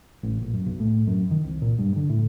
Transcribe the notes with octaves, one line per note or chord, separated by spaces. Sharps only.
A1
A#1
F#2
B1
A2
F#2
D#3
C2
A#2
G2
D3
A2